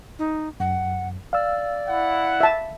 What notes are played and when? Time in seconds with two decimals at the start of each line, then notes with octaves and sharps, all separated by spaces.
0.19 D#4
0.60 F#2 F#5
1.33 D5 F5 E6
1.89 E4 F#5
2.41 E5 A5